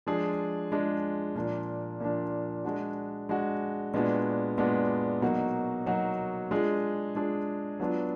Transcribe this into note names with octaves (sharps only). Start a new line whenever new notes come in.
F3 G#3 D4 F4 G#4
F3 G#3 D4 F4 G#4
A#2 F3 A#3 D4
A#2 F3 A#3 D4
G#3 D4 F#4
G#3 D4 F#4
A#2 G#3 B3 D4 F#4
A#2 G#3 B3 D4 F#4
B2 F#3 A#3 D#4 F#4
B2 F#3 A#3 D#4 F#4
G#3 D4 F4 G#4
G#3 D4 F4 G#4
F#3 B3 D4 F4